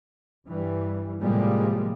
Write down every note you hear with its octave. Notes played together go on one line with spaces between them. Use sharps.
G2 E3 G3
A2 C3 F3 G3 G#3 A#3